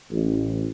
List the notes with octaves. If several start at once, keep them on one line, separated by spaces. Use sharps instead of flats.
A1